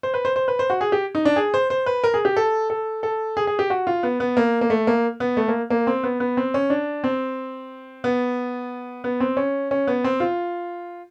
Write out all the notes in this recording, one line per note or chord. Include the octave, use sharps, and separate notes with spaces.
C5
B4
C5
C5
B4
C5
F#4
G#4
G4
D#4
D4
G#4
C5
C5
B4
A#4
G#4
G4
A4
A4
A4
G#4
G#4
G4
F#4
F4
B3
B3
A#3
A#3
A3
A#3
B3
A3
A#3
A#3
C4
B3
B3
C4
C#4
D4
C4
B3
B3
C4
C#4
C#4
B3
C4
F4